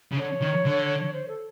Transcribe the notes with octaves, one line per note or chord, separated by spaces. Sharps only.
C#3
D3 C#5
D#3
D3
C5
A4